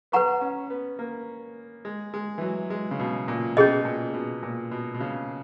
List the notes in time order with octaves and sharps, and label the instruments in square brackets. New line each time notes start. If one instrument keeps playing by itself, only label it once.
[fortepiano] B3 [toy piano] B4 F#5 A#5 C#6
[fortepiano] C#4
B3
A#3
G#3
G#3
E3
F#3
G#3
C#3
B2
A#2
[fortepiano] B2 [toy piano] C#4 G#4 D#5
[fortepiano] A#2
B2
A#2
B2
B2
C#3